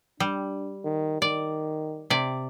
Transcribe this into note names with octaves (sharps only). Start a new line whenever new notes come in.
G3 D4
D#3
D#3 D5
C3 D5